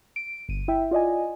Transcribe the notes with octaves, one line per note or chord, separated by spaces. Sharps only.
D7
G1 D#7
E4 E5 G5
F4 D5 D#5 G#5